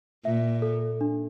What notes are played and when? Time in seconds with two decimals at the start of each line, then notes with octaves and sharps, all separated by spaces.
0.25 A#2 E5
0.62 A4
1.01 D4